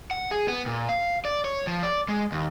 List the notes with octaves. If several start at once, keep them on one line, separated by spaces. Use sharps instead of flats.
F#5
G#4
B3
A#2
F5
D5
C#5
F3
D5
G#3
D#2